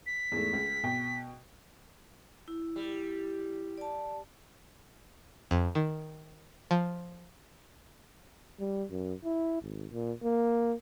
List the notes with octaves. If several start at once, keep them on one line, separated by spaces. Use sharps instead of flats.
B6
E2 G#2 A3
C#2
B2 G5
E4
G3
D5 A5
F2
D#3
F3
G3
F#2
E4
G#1
A#2
A#3